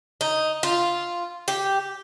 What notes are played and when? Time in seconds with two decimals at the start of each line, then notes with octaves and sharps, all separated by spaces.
0.21 D#4
0.63 F4
1.48 G4